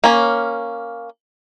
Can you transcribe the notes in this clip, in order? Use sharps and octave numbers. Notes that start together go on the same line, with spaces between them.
A#3 C#4